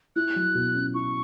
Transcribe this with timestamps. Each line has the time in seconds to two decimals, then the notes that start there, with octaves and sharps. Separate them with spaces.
0.16 E4 F#6
0.36 F#3
0.55 B2
0.74 C#4
0.94 E4 C#6